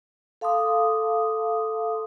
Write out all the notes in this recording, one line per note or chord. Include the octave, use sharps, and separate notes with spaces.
A4 F5 A5 C6 D6 D#6